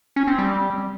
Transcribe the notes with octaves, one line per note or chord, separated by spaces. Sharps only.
C#4
C4
G3